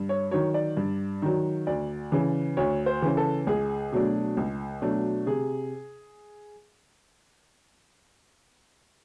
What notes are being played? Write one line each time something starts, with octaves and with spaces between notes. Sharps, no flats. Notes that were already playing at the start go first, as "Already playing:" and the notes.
Already playing: G2
C#5
D#3 F#3 C#5
D5
G2
D#3 F#3
D2 D5
C#3 E3
D2 C#5
C5
C#3 E3
A4
C#2 G#4
B2 F#3 A3 D4
C#2
B2 F#3 A3 D4
C3 G#4